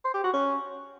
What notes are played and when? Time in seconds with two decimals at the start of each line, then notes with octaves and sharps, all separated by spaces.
0.05 C5
0.14 G4
0.24 F#4
0.33 C#4